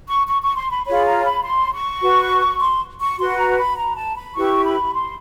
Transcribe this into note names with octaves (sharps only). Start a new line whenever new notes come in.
C#6
C#6
C#6
C6
B5
F4 G#4 C#5 B5
A#5
B5
C6
C#6
F#4 B4
C6
C#6
F#4 B4 C6
A#5
B5
A#5
A5
B5
E4 G4 B4 C#6
B5
C6